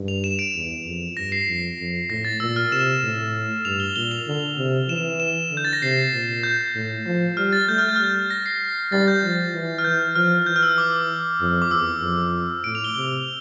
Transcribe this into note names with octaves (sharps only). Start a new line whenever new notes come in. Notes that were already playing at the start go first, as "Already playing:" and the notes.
Already playing: G2
F7
E7
D7
E2
F2
G2 A#6
C7
F2
F2
A2 A#6
A6
A#2 E6
F6
C3 E7
A2
G2 F7
G7
A#2 G7
F7
D3
C3
E3 E7
E7
D3
G6
A6
A#6
C3 C7
A#2
G6
A2
F3
G3 F6
A6
A3 G6
F6
G6
F6
G3 G6
A#6
C7
G3 A6
G6
F3
E3
F6
E3 G6
F3 F6
E3 G6
F6
E6
D6
F2
D6
E2 E6
F2
A2 D7
F7
G7
C3